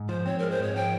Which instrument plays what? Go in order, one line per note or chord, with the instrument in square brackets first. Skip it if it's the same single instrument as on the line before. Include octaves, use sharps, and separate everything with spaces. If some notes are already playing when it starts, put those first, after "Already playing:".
Already playing: [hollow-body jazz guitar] G#2
[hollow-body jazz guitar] F3 [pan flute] C5
[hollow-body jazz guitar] C4 [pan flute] C#5
[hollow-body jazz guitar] G#3 [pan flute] A#4
[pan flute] C5
[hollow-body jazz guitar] G#2 [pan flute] C#5
[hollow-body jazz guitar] F3 [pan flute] G5